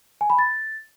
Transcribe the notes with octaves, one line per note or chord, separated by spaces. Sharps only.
G#5
B5
A6